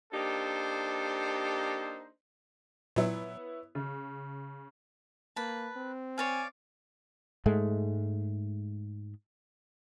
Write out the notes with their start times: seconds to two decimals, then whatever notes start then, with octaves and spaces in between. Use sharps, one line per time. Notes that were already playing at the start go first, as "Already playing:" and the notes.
0.13 A#3 D4 D#4 G4 A4 C5
2.96 A#2 F#3 B3 E4 C#5
3.75 C#3
5.36 A#3 B4 A5
5.76 C4
6.18 C#5 D5 F5 G#5
7.46 G#2 G#3 A3